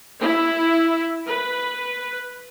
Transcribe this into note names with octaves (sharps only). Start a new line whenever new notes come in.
E4
B4